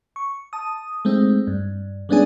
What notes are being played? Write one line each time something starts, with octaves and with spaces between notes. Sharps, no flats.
C#6
A5 D#6
G#3 A3 C4 D#4
G2
G3 G#3 B3 C#4 D4 G#4